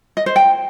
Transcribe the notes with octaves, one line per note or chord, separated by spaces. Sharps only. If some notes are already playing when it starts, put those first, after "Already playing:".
D#5
C5
G5